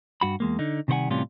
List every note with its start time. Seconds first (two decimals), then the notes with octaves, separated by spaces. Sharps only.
0.21 G2 F#4 B5
0.40 E2 G#3 A#3
0.59 D3 D#4
0.88 C3 D#3 G3 C5 F#5 G#5
1.10 A2 C3 E3 G3 C#4 F4